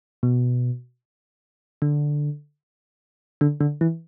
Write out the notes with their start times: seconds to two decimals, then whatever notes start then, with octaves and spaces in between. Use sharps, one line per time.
0.23 B2
1.82 D3
3.41 D3
3.61 D3
3.81 E3